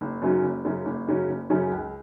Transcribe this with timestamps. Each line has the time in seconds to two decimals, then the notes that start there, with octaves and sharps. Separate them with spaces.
0.01 F#1
0.22 F#2 C#3 F#3 C#4
0.43 F#1
0.65 F#2 C#3 F#3 C#4
0.85 F#1
1.07 F#2 C#3 F#3 C#4
1.28 F#1
1.49 F#2 C#3 F#3 C#4
1.71 C#2